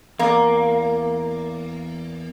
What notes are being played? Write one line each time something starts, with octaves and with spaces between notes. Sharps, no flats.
E2 A#3 D5